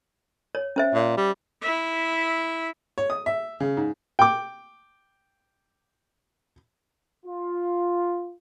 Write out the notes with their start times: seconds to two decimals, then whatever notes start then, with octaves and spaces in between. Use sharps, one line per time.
0.55 C#5
0.76 C#4 C5 E5
0.94 A#2
1.17 G3
1.61 E4 E5
2.98 C#5
3.10 D#6
3.26 E5
3.60 C#3
3.77 G#2
4.19 G5 D6
7.24 F4